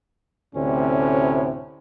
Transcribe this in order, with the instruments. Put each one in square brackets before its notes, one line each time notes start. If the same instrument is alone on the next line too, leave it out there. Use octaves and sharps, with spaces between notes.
[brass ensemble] D2 A2 C3 [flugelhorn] C#4